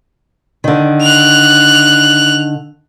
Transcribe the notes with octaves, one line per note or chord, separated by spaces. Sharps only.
D3 D#3
F#6 F7